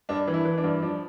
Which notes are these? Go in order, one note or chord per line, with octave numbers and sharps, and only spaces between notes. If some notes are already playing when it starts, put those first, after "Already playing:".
G2 D4
E3
E4
E3
D4
G2
F3 D4